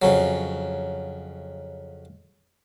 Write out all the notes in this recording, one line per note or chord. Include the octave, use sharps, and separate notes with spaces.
F2 C#3 F#3